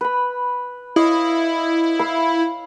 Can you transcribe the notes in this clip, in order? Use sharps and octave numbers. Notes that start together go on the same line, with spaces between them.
B4 B5
E4 C#5 D#5 F5
F5 B5 E6